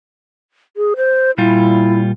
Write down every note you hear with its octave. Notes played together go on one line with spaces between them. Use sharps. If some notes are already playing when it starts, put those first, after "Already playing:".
G#4
C5
A#2 G3 E4 F4